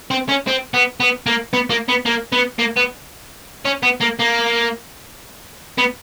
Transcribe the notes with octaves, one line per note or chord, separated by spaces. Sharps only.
C4
C#4
C4
B3
B3
A#3
B3
A#3
B3
A#3
B3
A#3
B3
C#4
B3
A#3
A#3
B3